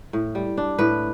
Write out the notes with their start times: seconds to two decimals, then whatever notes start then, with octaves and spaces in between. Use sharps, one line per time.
0.13 A2
0.35 G3
0.57 D4
0.79 A2 B4